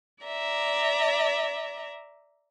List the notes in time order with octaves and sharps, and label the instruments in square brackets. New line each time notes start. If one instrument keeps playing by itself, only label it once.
[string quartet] D5 E5 A#5